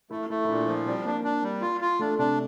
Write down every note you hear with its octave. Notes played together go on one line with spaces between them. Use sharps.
A3 E4
A3 E4
E4
A#2 D4
F3
G3 C4
A#3 D4
D4
G3
F4
F4
A3 D4
C3 D4